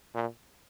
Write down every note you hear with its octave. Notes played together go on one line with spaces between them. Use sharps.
A#2